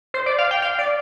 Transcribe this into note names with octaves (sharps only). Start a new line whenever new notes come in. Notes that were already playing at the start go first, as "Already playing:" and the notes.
C5
D5
F5
G5
F5
D5